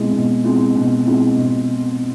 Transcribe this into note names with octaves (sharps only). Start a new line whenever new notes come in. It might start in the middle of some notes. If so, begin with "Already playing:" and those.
Already playing: B2 G#3 C4 E4
B2
G#3 C4 E4
B2
G#3 C4 E4
B2